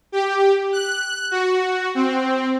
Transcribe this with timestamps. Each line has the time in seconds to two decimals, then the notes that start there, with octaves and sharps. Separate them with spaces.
0.12 G4
0.73 F#6
1.31 F#4
1.95 C4